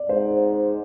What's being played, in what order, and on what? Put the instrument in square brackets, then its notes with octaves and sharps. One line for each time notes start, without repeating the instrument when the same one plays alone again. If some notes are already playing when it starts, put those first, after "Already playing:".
Already playing: [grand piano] D5
[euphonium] G#2 [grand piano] C5